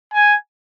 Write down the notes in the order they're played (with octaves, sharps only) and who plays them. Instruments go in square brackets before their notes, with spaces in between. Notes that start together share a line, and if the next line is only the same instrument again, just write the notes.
[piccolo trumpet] G#5